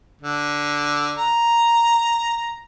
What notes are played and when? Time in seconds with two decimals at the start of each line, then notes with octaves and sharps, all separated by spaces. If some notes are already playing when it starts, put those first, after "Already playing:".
0.21 D3
1.18 A#5